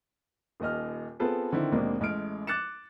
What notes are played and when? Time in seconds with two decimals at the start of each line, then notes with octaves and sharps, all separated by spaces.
0.60 D#1 D#2 D#5 F6
1.20 B3 C4 F4 G#4 A4 B4
1.52 D3 D#3 C4 E4
1.72 D#2 B2 G#3 A#3 C4 D4
2.00 A1 G#3 A3 F6 D7
2.47 D6 F#6 A6 C#7 E7